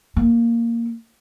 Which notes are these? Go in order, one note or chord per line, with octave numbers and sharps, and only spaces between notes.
A#3